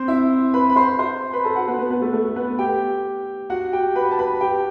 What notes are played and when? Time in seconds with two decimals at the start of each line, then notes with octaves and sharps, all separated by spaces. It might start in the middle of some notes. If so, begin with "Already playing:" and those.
Already playing: C4 C5
0.08 E4 E5
0.54 B4 B5
0.70 B5
0.76 C5 C6
0.99 C5 C6
1.33 B4 B5
1.44 A4 A5
1.56 F#4 F#5
1.67 B3 B4
1.79 B3 B4
1.91 B3 B4
2.02 A3 A4
2.13 A3 A4
2.36 B3 B4
2.59 G4 G5
3.50 F#4 F#5
3.73 G4 G5
3.95 B4 B5
4.11 A5
4.19 B4 B5
4.41 G4 G5